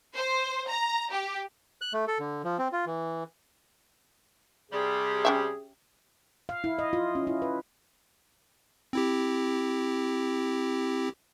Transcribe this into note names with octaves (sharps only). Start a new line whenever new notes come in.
C5
A#5
G4
F#6
A3
A4
D3
F3
C4
F4
E3
C3 G3 G#4
C#4 G4 E5
F5
E4
D#5
F4
C#4
E4
B4
C4 E4 G4